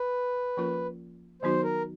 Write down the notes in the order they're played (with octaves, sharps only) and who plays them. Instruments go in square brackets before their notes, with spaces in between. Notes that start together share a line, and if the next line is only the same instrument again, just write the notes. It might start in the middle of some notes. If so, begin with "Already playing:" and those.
Already playing: [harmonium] B4
[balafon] F3 A#3 C#4 F4 A#4
[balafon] D#3 F#3 B3 D#4 F#4 [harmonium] C5
[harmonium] A#4